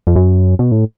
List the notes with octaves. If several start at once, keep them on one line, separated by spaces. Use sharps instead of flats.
F2
F#2
B2
A2